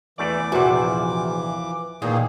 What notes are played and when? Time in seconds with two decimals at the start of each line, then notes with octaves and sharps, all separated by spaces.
0.18 E2 E3 A3 D5 D6
0.52 A#1 E2 C3 F3 F#4
2.02 D#2 A#2 D#3 E3 A#3 D#4 G#4